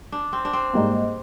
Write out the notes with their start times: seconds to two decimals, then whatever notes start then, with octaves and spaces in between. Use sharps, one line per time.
0.12 D4
0.33 C4
0.45 D4
0.53 C4
0.73 G#2 G3 A#3